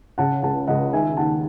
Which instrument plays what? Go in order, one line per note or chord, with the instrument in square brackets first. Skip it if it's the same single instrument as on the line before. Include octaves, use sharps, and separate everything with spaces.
[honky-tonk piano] C#3 [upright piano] F#5 A5
[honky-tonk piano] C#2 [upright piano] F#5 A5
[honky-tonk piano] C#2 [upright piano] D#5 F#5
[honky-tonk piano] D#3 [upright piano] E5 G#5
[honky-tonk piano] D#2 [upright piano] F#5 A5